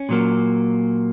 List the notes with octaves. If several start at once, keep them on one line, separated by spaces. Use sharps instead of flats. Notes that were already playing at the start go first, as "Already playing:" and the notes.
Already playing: C#4
A#2 F#3 A#3